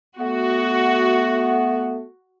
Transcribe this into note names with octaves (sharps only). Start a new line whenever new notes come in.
A3 B3 F#4